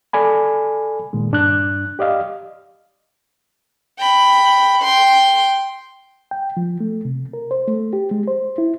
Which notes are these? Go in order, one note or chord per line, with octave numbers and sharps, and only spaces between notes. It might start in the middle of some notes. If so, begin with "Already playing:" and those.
A4 D5 G#5 B5
A#2 D#3 G#3
G2 D4 F#6
G4 D5 D#5 F5
G5 B5
G5 C6
G5
F3
A3
C3
A#4
C5
A3
G4
G#3
C5
E4